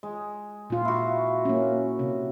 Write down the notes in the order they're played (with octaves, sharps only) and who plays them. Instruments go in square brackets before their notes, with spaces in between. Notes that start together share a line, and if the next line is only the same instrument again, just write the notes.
[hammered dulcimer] G#3
[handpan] A#2 F4
[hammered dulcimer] E4 F#4
[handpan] A#3 C#4
C3